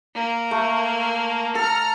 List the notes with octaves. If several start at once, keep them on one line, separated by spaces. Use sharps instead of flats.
A#3
A3
A4 A#5 F6